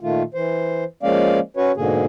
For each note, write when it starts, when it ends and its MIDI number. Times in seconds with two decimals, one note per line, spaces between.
0.01 0.23 46
0.01 0.23 51
0.01 0.23 57
0.01 0.23 65
0.34 0.84 52
0.34 0.84 72
1.03 1.39 53
1.03 1.39 56
1.03 1.39 58
1.03 1.39 61
1.03 1.39 74
1.03 1.39 77
1.57 1.72 61
1.57 1.72 66
1.57 1.72 71
1.57 1.72 73
1.77 2.06 44
1.77 2.06 47
1.77 2.06 50
1.77 2.06 58
1.77 2.06 68